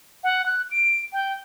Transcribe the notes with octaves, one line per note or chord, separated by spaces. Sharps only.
F#5
F#6
D7
G5